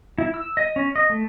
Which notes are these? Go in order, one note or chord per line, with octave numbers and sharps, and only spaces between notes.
E4
E6
D#5
C#4
D#5
A3